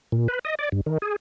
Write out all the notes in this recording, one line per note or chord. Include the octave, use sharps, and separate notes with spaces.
A#2
B4
D#5
D5
G2
D#3
G#4